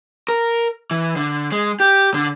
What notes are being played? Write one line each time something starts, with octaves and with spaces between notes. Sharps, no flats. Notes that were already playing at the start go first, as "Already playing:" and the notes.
A#4
E3
D3
G#3
G4
D3